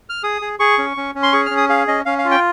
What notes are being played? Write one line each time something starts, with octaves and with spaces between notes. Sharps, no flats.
F6
G#4 D#6
G#4
G#4 C#6
C#4
C#4
C#4
C6
G#4 C#6
F6
C#4
D#6
G#4 F5
C#4 D#5
C#4 F5
F5
F4
G5